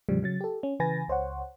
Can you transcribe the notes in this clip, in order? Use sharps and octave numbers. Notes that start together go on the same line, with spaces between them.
E2 A2 C#3 F3 G3
C#3 F#3 A6
G4 A4
C#4
C#3 E3 B4 G#5 A6 A#6
C#2 C5 C#5 F#5